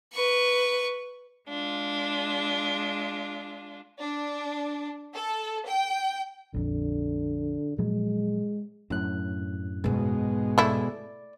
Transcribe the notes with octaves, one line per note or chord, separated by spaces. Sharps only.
B4 C#6
G#3 D4 F4
D4
A4
G5
A#1 F2 D3
A#2 F3 F#3 G#3
F#2 A2 D4 F#6
B1 G#2 B2 G#3
A3 E4 D5